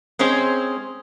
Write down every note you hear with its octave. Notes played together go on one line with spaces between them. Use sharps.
G#3 C4 C#4 G#4 C5